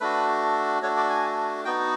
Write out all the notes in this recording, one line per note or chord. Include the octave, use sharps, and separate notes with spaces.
A3 D4 F#4 B4
A3 D4 F#4 C#5
D5
G#5
B3 D#4 F#4 G5